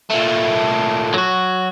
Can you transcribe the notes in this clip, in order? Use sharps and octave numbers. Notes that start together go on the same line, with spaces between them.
A#2 A3
F#3 F#4